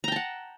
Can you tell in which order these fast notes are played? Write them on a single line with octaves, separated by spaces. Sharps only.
A#5 G5 A5 F#5